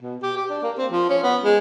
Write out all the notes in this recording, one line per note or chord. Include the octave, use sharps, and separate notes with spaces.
B2
G4
G4
D4
A#3
C4
F3
C#4
B3
G#3